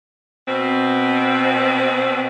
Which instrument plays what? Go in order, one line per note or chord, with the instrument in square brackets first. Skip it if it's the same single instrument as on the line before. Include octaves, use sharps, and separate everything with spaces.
[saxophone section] B2 C4